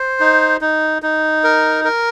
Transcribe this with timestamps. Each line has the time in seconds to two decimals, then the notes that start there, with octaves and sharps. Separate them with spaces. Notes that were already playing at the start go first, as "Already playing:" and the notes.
Already playing: C5
0.20 D#4
0.61 D#4
1.02 D#4
1.44 A#4
1.84 A#4